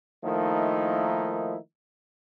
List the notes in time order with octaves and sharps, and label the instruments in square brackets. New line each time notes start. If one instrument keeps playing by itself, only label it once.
[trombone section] D#3 F3 A3 A#3 D#4 E4